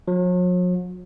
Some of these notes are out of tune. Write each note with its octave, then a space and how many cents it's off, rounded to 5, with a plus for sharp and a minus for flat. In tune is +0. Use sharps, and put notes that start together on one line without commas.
F#3 -45